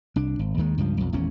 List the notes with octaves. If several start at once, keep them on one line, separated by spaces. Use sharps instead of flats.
C2 D4
G#1
D#2 D#3 G#3
C#2 G2 F3
B1 F2
G#1 E2 A#2 C#4